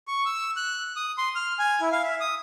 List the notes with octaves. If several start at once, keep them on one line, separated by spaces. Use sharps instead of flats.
C#6
E6
F#6
D#6
C6
F6
G#5
E4
F5
E5
D#6